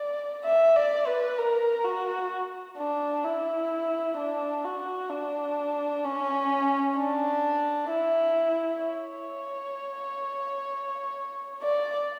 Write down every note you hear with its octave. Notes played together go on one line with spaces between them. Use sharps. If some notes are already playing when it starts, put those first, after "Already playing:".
Already playing: D5
E5
D5
B4
A#4
F#4
D4
E4
D4
F#4
D4
C#4
D4
E4
C#5
D5